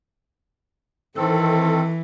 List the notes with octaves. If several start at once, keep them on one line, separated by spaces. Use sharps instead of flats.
D#3 E3 C4 A4